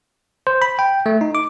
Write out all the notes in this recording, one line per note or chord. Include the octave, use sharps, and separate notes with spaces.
C5
B5
G5
A3
D#4
D6